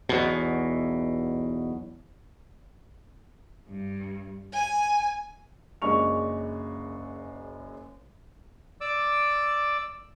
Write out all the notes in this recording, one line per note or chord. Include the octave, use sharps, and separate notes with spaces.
B1 E2 B2
G2
G#5
F#1 F#2 G#3 D4 C#6 F7
D5 D6 E6